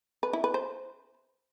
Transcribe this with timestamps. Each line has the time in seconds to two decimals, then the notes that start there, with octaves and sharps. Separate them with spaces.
0.23 B4
0.33 E4
0.44 B4
0.54 C5